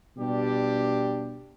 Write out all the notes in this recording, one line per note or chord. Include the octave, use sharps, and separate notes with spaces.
B2 G3 D4 G4